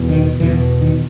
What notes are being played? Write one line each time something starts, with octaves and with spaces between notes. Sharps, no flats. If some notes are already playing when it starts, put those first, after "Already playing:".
Already playing: E2 B2
D#3
E2 B2 E3
D#3